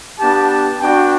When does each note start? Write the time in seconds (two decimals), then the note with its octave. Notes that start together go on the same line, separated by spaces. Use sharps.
0.20 B3 D4 G4 A5
0.50 A5
0.81 B3 D4 F#4 G5